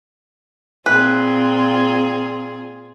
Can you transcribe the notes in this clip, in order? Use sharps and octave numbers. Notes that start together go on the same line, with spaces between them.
A#2 C4 F4 G#4 B4